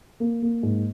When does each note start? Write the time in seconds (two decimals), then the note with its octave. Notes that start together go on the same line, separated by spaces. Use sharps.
0.20 A#3
0.42 A#3
0.63 G#2